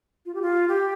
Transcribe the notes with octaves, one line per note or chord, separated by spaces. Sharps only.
F4
G4
F4
G4